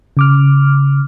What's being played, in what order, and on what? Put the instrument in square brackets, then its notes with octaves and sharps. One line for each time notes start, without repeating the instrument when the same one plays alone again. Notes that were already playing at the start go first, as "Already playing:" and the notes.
[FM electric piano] C#3 D6 F6